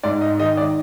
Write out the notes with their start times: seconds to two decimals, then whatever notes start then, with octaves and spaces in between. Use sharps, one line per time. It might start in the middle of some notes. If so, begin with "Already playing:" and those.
0.03 G#2 D5
0.21 D#5
0.39 D#3 D#5
0.57 D5